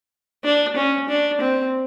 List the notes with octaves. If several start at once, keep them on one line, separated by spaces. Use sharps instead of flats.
D4
C#4
D4
C4